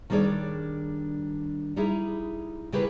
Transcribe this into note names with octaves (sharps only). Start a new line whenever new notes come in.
D#3 G3 D4 G#4 C#5 D5
G3 D#4 E4 G#4
C#3 E4 G4 G#4 A#4 B4